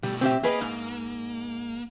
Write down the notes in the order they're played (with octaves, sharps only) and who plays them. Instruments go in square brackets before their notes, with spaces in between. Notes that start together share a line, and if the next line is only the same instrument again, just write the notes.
[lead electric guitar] B2 A3 [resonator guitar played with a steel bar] G3
[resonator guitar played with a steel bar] C4 G4 E5
[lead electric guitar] A#3 [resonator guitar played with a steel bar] G#4 B4 D#5
[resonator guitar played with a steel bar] G#2